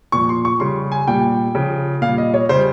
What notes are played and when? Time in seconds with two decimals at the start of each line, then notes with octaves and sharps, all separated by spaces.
0.12 A#2 F3 C#6
0.29 C6
0.45 C#6
0.60 C#3 G3 C6
0.92 G#5
1.07 A#2 G3 G5
1.55 C#3 F3
2.02 A#2 G3 F5
2.18 D#5
2.34 C#5
2.49 C#3 G3 C5